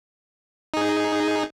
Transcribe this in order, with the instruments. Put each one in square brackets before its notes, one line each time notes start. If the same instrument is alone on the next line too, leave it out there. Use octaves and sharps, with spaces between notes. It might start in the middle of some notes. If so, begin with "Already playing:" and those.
[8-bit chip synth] D#4 G#4